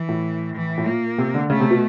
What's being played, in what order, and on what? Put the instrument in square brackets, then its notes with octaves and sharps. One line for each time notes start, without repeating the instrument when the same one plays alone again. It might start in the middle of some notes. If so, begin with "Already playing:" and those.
Already playing: [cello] E3
[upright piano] A2
[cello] E3
[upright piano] A2
[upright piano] A#2 [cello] A#3
[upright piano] C3
D3
[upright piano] C#3 [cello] A3
[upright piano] C3
B2